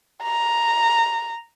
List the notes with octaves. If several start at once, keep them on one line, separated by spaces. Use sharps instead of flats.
A#5